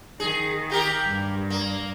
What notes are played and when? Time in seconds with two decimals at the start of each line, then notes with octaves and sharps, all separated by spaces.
0.20 D#3 G#4
0.70 A#3 G4 A#4
1.06 G2
1.50 A#3